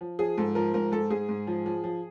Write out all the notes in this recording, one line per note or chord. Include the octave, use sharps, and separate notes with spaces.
F3
F3 G#4
G#2 A4
F3 A#4
G#2 A#4
G#2 A4
G#2 G#4
G#2
F3
F3
F3